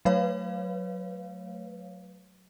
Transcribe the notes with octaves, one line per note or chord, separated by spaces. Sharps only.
F#3 A3 B4 C#5 F5